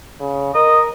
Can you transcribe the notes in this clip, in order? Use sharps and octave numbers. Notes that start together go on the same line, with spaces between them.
C#3
A#4 D#5